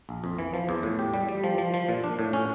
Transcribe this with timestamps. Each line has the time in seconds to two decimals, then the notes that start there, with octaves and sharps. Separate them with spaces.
0.09 A#1
0.24 F2
0.39 E3
0.54 F3
0.69 E2
0.83 A2
0.99 G4
1.14 G3
1.29 G3
1.44 F3
1.58 F3
1.74 F3
1.89 A#2
2.04 D4
2.19 A2
2.33 C#4